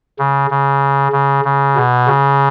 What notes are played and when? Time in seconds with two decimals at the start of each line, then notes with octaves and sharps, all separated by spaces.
0.19 C#3
0.51 C#3
1.12 C#3
1.45 C#3
1.76 B2
2.07 C#3